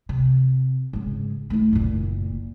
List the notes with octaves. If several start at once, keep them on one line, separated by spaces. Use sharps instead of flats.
C3
G#2 C#3
A3 E4
F#1 A#2